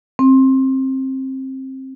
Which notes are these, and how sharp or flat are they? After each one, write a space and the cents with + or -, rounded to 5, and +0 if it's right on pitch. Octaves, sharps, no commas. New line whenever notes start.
C4 +20